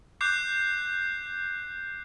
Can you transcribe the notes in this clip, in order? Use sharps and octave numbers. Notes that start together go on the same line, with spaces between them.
D6 F#6 G6 C7